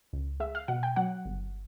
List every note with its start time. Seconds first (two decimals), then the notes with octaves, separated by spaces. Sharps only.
0.13 C#2
0.40 G#3 E5
0.55 F5
0.68 B2 F#5
0.83 G5
0.96 F#3 F#5
1.25 G1